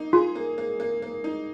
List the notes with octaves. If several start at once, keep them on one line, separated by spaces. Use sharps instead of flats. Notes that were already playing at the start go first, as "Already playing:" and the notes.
Already playing: A#3 D#4
F4 G#4
A#3
A#3
A#3
A#3
D#4